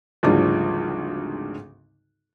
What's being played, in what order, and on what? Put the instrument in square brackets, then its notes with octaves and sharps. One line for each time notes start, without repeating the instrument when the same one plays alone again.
[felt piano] G#1 D2 G#2 C#3 F3 G3